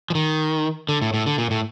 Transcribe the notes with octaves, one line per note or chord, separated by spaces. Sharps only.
F3
D#3
D3
A2
A2
D3
A#2
A2